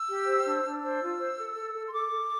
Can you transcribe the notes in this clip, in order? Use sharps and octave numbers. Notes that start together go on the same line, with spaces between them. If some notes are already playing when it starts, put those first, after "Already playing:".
Already playing: E6
G4
C5
D4
D4
C5 E6
F4
C5
A4
A4
A4
C6
A4 D6
A4